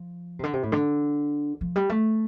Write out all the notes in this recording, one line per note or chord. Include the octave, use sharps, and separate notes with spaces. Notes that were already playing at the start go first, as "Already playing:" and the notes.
Already playing: F3
C3
D3
C3
A2
D3
F3
G3
A3